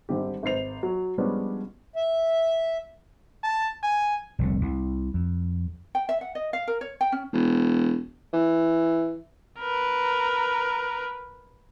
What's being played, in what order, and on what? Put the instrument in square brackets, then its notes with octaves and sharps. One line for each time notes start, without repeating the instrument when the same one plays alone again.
[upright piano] G#1 G#2 D3 G3 G4
G#1 B4 C5 C7 F7
F#3
F3 G3 G#3 B3 C#4 D4
[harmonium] E5
[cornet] A5
G#5
[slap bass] F1 C2 D3
C2
F2
[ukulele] G5
E5
F#5
D#5
F5
A#4
C#5
G5
C#4
[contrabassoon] E1
E3
[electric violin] A#4 B4